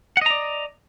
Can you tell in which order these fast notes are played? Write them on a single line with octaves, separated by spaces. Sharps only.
F#5 D#5 A#5 D5